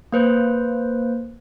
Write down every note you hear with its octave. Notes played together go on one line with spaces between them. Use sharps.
A#3 B4 C5